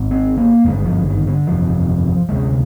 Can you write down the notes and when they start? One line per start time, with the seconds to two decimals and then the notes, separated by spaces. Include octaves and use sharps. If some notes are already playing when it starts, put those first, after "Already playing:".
Already playing: G#1 G#2
0.11 C4
0.38 A#3
0.65 G#1 G2 D3 G#3
0.86 F3
1.06 D#3
1.27 D3
1.47 G1 F2 C3 F3
2.29 D2 C3 G#3